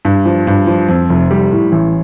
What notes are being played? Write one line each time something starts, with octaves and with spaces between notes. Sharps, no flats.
G2
F3
G2
F3
F2
F1
G3
A2
A1